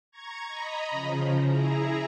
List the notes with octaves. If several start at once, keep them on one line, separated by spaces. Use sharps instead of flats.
A#5 C#6 G#6
D#5 A#5 B5
C#3 F3
E4 G#4 A#5